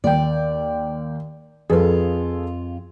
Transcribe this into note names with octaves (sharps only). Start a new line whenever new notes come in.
D#2 D5 G5
F2 F4 G#4 A4 B4